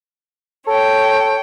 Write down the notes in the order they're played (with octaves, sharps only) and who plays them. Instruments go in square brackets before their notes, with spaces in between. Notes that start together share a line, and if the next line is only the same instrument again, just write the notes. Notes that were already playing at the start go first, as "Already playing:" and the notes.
[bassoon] A4 [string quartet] C#5 G5